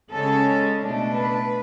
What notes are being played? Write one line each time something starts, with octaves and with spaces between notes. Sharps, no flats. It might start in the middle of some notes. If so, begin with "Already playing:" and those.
C#3 G#3 C#4 A4
B2 A3 D4
B4